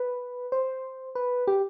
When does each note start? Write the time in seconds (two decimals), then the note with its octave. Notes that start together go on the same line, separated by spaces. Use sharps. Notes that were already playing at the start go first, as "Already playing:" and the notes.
Already playing: B4
0.52 C5
1.15 B4
1.47 G4